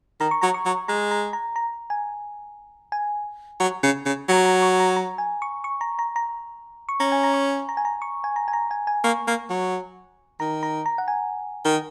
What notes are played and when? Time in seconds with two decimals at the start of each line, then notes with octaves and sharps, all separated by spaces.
0.20 D#3 A#5
0.31 C#6
0.42 F#3 A#5
0.54 C#6
0.66 F#3
0.88 G#3 A#5
1.11 A#5
1.33 A#5
1.56 A#5
1.90 G#5
2.92 G#5
3.60 F#3
3.83 C#3
4.05 C#3
4.28 F#3 A#5
4.38 C#6
4.45 A#5
4.62 C#6
4.79 A#5
4.96 A#5
5.18 G#5
5.42 C#6
5.64 C#6
5.81 A#5
5.99 A#5
6.16 A#5
6.89 C#6
7.00 C#4 A#5
7.12 G#5
7.23 A#5
7.34 C#6
7.69 A#5
7.77 G#5
7.85 A#5
8.02 C#6
8.24 G#5
8.36 A#5
8.48 G#5
8.53 A#5
8.71 G#5
8.87 G#5
9.04 A#3 C#6
9.27 A#3
9.49 F#3
10.40 D#3 A#5
10.63 A#5
10.86 A#5
10.98 F#5
11.08 G#5
11.65 D#3